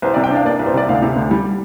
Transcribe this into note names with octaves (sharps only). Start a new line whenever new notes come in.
C2 C5
C3 D5
G5
D4 F5
A#3 D5
C2
C5
C3 D5
D2 F5
C3
D2
G3